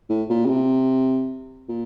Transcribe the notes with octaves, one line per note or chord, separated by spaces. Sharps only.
A2
A#2
C#3
C3
A#2